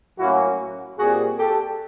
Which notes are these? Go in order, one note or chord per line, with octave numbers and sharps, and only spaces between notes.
A2 F#3 A#3 C#4 E4 F#4
A#2 G3 C4 F#4 G#4
G4 A4